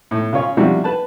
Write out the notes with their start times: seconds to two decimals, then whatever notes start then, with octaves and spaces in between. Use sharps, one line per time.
0.11 A2
0.33 C#3 F4 C#5
0.57 C3 F3 G3 D4 E4 F#4
0.84 B4 A5